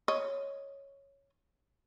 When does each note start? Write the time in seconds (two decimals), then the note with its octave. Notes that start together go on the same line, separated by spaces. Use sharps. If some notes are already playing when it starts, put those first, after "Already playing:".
0.08 C#5 D#5